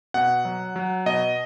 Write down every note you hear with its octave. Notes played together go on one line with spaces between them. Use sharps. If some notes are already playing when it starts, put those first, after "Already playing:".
B2 F#5
F#3
F#3
B2 D#5